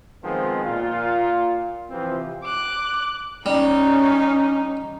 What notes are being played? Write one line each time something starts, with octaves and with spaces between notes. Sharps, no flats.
D#3 F3 G#3 B3 C4
A#2 F4
C3 E3 F3 C4
D6 F#6
G3 C#4 D#4